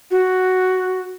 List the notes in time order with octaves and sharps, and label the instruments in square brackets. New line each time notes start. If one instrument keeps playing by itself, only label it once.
[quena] F#4